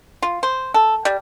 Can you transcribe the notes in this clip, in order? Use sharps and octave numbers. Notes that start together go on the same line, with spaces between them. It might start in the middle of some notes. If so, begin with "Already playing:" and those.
F4
C5
A4
G3